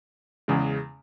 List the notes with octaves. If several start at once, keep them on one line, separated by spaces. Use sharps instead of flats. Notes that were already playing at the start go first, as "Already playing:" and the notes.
E2 C#3 G#3